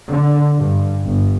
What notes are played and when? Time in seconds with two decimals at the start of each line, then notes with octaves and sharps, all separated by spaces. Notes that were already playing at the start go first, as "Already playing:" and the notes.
0.11 D3
0.59 G2
1.04 G1